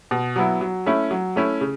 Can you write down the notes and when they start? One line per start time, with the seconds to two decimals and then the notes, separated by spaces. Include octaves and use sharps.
0.11 B2
0.36 F#3 B3 E4
0.61 F#3
0.86 A3 C#4 E4
1.11 F#3
1.36 A3 C#4 E4
1.61 C#3